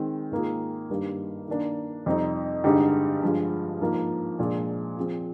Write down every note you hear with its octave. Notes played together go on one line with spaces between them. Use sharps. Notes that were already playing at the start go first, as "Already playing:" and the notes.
Already playing: D#3 G#3 C4
G#2 D#3 A#3 F4 G#4
G2 D#3 G3 A#3
D#3 A#3 D4
F2 C3 G3 C4 D#4
G2 D3 G#3 D#4 G4
G2 F3 G#3
G#2 F3 A#3
A#2 F3 G#3 D4 G#4
F3 C4 F4 G#4